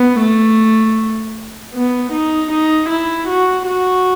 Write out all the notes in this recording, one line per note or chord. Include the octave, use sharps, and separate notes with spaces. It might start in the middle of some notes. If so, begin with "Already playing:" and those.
Already playing: B3
A3
B3
D#4
D#4
E4
F#4
F#4